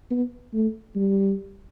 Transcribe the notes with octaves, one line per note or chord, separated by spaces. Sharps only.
B3
A3
G3